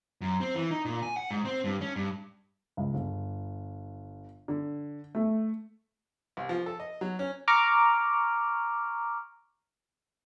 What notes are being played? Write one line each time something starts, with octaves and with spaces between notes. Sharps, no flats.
F#2
C4
E3
D#4
A#2
G#5
F#5
G#2
C4
G2
C#4
G2
C#2
G1
D3
A3
C2
F3
A4
D#5
F#3
C#4
A#5 C#6 D6 F6